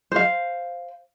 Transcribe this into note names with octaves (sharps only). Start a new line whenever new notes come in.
C5 F5